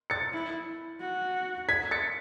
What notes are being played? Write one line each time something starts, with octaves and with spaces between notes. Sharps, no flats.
A6 C#7
E4
F#4
G#6 B6
A6 C#7